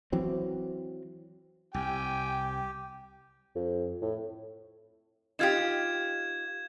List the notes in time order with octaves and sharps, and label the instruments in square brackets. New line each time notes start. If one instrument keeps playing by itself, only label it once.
[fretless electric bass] E3 F#3 C4
[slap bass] C2 [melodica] G4 [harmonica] G5 G#5
[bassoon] F2
A2
[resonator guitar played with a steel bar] D#4 F4 G4 [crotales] G#6 E7